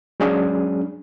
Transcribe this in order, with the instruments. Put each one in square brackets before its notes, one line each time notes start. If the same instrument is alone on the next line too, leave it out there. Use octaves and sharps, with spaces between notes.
[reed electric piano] F#3 G#3 C#4 D4 G#4